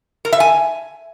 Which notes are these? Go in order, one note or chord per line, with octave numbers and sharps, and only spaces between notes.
A#4
E5
G#5